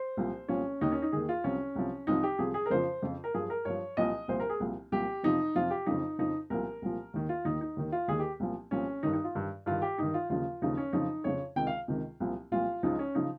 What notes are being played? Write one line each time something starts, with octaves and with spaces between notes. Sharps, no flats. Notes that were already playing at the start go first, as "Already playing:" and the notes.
Already playing: C5
C2 A#2 F3
C2 A#2 F3 C#4
D#2 D#3 D#4
C#4
D#4
D#2 D#3 G#4
F4
C2 C3 F3 C#4
C2 C3 F3
C2 C3 F3 D#4
G4
C2 C3 F3 G#4
G#4
A#4
F2 C#3 F3 C5
F2 C#3 F3
A#4
G2 F3 G#4
A#4
G2 F3 C#5
C2 A#2 F3 D#5
C2 A#2 F3 C5
A#4
G#4
C2 A#2 F3
C2 A#2 F3 G4
F2 C3 F3 D#4
F2 C3 F3 F4
G4
F2 C#3 F3 D#4
F2 C#3 F3 D#4
C2 A#2 F3 A#4
C2 A#2 F3
D#2 D#3
F4
D#2 D#3 D#4
D#4
D#2 D#3
F4
D#2 D#3 G#4
G4
C2 A#2 F3
C2 A#2 F3 C#4
G2 D#3 D#4
D#4
F4
G2 D#3
G2 D#3 F4
G4
G2 D#3 D#4
F4
D#2 C#3 F3 F4
D#2 C#3 F3 D#4
C#4
F2 C#3 F3 D#4
F2 C#3 F3 C#5
C#2 C3 D#3 G5
F5
C#2 C3 D#3
C2 A#2 F3
C2 A#2 F3 F4
C#2 C#3 F3 D#4
C#4
C#3 F3 D#4